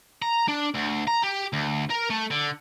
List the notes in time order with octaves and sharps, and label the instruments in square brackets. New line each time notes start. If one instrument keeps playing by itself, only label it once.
[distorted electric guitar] A#5
D4
D2
A#5
G4
D2
A#4
A3
D3